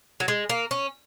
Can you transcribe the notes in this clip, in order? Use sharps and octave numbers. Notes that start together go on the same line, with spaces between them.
F#3
G#3
A#3
C#4